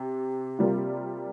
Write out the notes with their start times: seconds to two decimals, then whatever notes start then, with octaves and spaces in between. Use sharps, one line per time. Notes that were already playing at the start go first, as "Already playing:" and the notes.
Already playing: C3 G4
0.59 C3 G3 A#3 F4